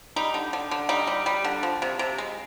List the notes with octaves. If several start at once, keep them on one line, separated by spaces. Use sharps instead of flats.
G3 D#4
D3
D3
D3
G3 D#4
G3
G3
D3
F3
C3
C3
G#3